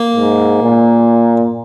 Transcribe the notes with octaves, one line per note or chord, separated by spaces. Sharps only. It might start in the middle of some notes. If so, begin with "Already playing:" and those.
Already playing: A#3
G#2
A#2